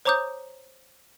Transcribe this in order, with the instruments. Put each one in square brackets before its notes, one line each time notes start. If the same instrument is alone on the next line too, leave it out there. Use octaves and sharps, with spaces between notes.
[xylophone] C5 C#5 A#5 D6 D#6 G6